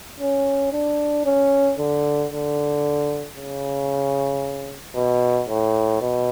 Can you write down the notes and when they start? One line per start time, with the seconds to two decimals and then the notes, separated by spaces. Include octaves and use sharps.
0.20 C#4
0.73 D4
1.26 C#4
1.79 D3
2.32 D3
3.37 C#3
4.96 B2
5.49 A2
6.01 B2